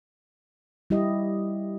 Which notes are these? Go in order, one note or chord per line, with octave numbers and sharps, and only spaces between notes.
G3 E4 G4 D#5